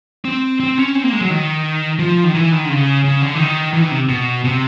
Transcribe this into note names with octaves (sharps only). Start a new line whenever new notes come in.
C4
C4
C#4
C4
A#3
G#3
F#3
D#3
F3
D#3
E3
D#3
D3
C#3
C#3
D3
E3
D#3
E3
D#3
C3
B2
C3